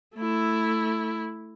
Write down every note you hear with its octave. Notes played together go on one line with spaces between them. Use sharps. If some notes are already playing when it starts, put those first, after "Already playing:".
A3 E4